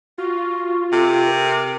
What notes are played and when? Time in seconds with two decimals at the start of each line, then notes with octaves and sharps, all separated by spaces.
0.18 F4 F#4
0.92 C3 A4
1.26 A#4